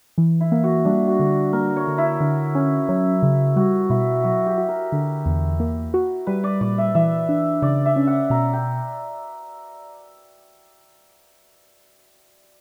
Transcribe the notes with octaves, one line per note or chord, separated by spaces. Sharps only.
E3
E4
A#3
F#4
G3 D4
F#4
D3
A#3 A#4
C#5
D3
E4
D3
C#4
F#3
C#3
G3 F#4
B2 E4
F#3 F#4
G4
F#4
A#4
D3
E2
A#3
F#4
G3 B4
D5
A#2 D5
E5
E3 E5
D4
C#3 D5
E5
C#4
F#5
B2 A#5
G5